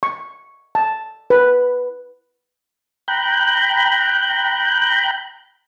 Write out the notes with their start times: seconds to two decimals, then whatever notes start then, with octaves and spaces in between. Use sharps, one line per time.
0.03 C#6
0.75 A5
1.30 B4
3.08 G5 A#5 B5 F#6 G6